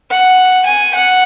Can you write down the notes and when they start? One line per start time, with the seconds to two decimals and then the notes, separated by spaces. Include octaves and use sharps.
0.10 F#5
0.66 G#5
0.95 F#5